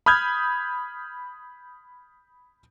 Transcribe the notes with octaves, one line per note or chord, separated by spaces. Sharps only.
B5 D#6 F6 G6 G#6